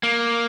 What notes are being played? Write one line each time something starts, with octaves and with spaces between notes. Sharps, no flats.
A#3